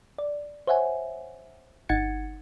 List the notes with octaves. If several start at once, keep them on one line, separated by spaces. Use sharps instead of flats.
D5
C5 C#5 E5 F#5 G#5
G1 D#4 F#5 G#6 A6 C#7